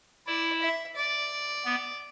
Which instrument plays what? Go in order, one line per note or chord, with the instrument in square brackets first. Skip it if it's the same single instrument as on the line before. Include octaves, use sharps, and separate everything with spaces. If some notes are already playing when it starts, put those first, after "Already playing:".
[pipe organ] E4 [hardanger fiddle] D5
[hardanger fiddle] E5
D5
[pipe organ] B3